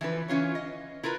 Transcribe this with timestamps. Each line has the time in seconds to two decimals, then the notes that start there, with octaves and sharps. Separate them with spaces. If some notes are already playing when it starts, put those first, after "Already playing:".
0.01 E3 F3 D4 B4
0.28 E3 C#4 F4 C#5
0.55 D#5
1.03 E4 F4 A#4 B4